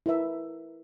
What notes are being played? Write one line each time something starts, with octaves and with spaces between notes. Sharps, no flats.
E4 A#4 B4 E5